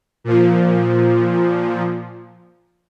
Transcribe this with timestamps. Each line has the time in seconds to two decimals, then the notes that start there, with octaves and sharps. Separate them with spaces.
0.24 A#2 F3